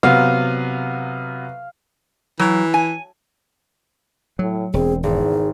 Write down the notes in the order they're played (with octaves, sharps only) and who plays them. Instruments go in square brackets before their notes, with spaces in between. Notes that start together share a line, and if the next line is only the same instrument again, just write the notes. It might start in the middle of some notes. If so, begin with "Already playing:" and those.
[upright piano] C3 F#3 B3 [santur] F5
[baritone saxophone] E3 [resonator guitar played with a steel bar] F#3
[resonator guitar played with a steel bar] G#5
[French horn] A2 [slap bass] F#3
[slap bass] E1 [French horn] C4 [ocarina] G#4
[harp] G#1 [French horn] E2 [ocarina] G#4